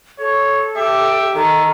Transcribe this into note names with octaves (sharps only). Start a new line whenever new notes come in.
A4 C#5
G4 E5
D#3 A4